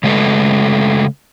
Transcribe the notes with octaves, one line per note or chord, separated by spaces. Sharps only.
C#3 G#3 A3 A4 B4